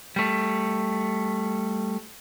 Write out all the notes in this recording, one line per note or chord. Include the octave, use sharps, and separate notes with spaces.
G3 A3